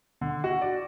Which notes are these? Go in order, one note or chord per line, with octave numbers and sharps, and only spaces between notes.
D3
F#4
D5